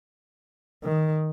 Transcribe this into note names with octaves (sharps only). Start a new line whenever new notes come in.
D#3